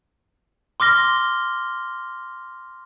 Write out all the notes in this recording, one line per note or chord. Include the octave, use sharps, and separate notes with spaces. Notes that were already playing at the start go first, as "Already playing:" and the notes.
C6 D6 F6 A#6 G7